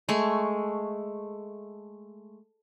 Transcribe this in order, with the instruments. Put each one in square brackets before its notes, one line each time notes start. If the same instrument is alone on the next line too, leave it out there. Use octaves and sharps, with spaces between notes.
[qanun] G#3 A3 G#5 C#6